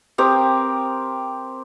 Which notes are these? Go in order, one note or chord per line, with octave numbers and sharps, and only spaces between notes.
C4 G4 A#4 D#6